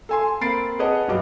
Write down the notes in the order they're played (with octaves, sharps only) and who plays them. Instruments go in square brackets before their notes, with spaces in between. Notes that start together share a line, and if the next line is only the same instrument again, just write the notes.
[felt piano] A4 G#5 C6
A#3 C4 B5 A6 C7 D7
G#4 B4 C#5 D#5 F#5 A5
B1 G2 D#5 D6